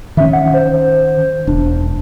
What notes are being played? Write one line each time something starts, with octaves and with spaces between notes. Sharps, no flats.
D#3 C#4 E5
F#5
C5
E1 D4